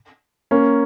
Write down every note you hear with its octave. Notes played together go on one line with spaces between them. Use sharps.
A#3 C#4